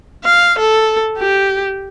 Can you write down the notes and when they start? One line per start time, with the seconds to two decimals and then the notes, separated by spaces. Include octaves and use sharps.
0.25 F5
0.59 A4
1.18 G4